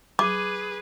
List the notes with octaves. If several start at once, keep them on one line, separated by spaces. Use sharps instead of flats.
G#4 B4 D6